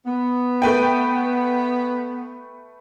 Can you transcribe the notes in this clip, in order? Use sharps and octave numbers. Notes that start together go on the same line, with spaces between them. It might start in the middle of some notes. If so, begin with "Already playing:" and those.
B3
A3 B4 G5